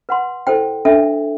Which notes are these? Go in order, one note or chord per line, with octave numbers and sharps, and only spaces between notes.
B4 F#5 C6
E4 A4 C5 G5
D4 A4 E5 G5